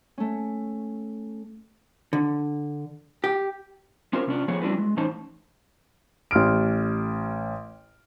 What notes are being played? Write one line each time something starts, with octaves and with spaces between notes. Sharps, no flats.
A3 C#4
D3
G4
C4 C#4 F4 G4 A#4 C5
C3 C#4 D4 F4
F3 A3 B3 G#4 C#5
G3 C#4 D4 E4 F#4 B4
G#3
A2 E3 C#4 D#4 C5 A5
A1 C6 F6 D7